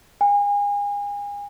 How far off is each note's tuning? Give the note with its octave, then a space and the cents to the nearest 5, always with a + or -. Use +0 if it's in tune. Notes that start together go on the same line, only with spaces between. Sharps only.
G#5 -35